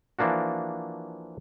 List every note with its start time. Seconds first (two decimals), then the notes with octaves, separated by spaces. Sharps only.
0.19 E3 F3 A#3 D4 F#4